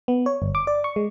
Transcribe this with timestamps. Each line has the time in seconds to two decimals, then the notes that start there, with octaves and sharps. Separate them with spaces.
0.08 B3
0.26 C#5
0.42 G1
0.55 D6
0.67 D5
0.84 C#6
0.96 G#3